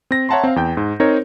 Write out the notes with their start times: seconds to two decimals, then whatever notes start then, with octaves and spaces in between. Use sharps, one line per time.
0.11 C4 A#6
0.29 C#5 E5 F#5 A5 A#5 C6
0.44 C4 F5
0.56 E2 G5 G6
0.77 G#2
1.00 C4 D#4 A#4 C5 C#5